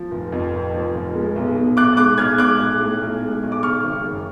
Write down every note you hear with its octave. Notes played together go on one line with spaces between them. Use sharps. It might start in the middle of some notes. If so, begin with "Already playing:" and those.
Already playing: F3
F1
F2
F1
F3
F1
G#3
B1
B2
B1 D6 F#6
G#3 D6 F#6
B1 F6 G#6
G#3 D6 F#6
B1
A2
B1
G#3
B1
D6
C#3 C#6 F6
G#1
F#2